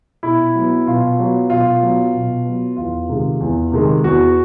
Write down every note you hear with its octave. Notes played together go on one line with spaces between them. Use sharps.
B2 E4
F#3 B3
B2 F4
F#3 B3
B2 F4
F#3 B3
B2
F#3 B3
E2 F4
C3 D#3 G#3
E2
C3 D#3 G#3
E2 F#4